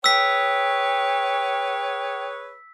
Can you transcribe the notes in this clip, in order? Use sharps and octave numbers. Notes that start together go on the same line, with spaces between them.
G#4 B4 C#5 G5 E6 B6